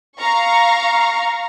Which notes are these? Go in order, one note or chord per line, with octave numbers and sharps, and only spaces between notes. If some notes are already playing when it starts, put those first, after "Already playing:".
F5 A#5 C#6